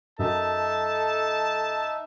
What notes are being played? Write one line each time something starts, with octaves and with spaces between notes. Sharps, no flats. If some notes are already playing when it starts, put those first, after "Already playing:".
F#2 D#4 A4 E5 A5